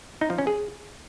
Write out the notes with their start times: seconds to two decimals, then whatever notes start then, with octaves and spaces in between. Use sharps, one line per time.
0.21 D#4
0.30 F3
0.38 C#4
0.47 G#4